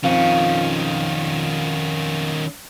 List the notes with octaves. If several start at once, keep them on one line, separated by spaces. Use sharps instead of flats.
F2 D#3 C#4 F4 F5